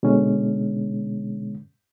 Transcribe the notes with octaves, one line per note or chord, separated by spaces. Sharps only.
B2 D3 G#3 C#4